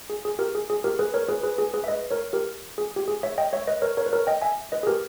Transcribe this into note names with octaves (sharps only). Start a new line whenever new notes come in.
G#4
G#4
G4 A#4
G#4
G#4
G4 A#4
G#4 B4
A#4 C#5
G#4 B4
G#4 B4
G#4
G#4 B4
E5
B4 D#5
A#4 C#5
G4 A#4
G#4
G4
G#4
C#5 E5
D#5 G5
C#5 E5
B4 D#5
A#4 C#5
A#4 C#5
B4
A#4 C#5
D#5 G5
E5 G#5
B4 D#5
G#4
G4 A#4